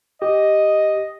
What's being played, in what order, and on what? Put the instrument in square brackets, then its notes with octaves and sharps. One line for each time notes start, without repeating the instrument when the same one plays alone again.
[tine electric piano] G4 [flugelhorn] D#5